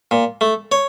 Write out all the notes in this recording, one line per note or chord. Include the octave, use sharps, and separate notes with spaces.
A#2
A3
C#5